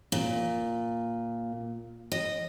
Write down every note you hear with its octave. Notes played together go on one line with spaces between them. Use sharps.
A#2
D#5